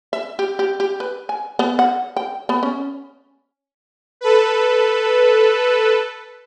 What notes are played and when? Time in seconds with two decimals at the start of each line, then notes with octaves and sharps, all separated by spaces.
0.13 E5
0.39 G4
0.59 G4
0.80 G4
1.00 B4
1.29 G#5
1.59 B3
1.79 F#5
2.16 G5
2.49 B3
2.63 C#4
4.21 A4 B4